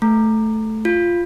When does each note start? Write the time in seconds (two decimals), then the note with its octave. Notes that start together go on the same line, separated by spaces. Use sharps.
0.02 A3
0.85 F4